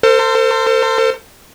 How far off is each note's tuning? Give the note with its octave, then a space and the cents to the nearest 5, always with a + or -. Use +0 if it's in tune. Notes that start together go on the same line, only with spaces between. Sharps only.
A4 +45 C5 -10